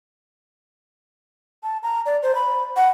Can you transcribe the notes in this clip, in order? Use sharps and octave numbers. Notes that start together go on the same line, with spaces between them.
A5
A#5
D5
C5
B5
F#5